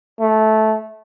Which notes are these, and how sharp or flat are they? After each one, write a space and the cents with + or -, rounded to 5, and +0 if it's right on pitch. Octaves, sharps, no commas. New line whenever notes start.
A3 -15